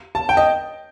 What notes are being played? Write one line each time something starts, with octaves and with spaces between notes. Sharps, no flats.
A5
G5
D#5